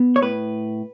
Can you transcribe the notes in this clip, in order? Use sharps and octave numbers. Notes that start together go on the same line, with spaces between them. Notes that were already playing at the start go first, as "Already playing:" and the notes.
Already playing: B3
C#5
A2 B4